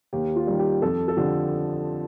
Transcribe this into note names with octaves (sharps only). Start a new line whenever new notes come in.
D#2 G4
F4
D#3 G3
G4
F2 A4
A4
D3 F3 G4